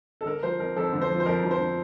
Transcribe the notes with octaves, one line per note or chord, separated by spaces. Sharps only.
A4
D3 A#4
F3 C5
F2 A#4
F2 A4
D3
C5
F3
C5
F2 A#4
F2
C5
D3